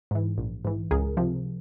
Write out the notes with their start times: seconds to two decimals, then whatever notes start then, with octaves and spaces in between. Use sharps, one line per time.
0.11 G#2 E3
0.38 A#1
0.65 G#2 E3
0.91 C#2 G#4 A#4
1.17 C3 F3